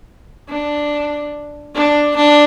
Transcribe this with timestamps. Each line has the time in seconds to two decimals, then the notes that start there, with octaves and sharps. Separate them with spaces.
0.49 D4
1.75 D4
2.16 D4